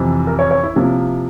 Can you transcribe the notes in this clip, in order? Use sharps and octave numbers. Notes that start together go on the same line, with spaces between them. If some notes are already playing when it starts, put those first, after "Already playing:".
Already playing: F2 C3 E3
A#4
C#5
C#5
E4
C3 F3 A#3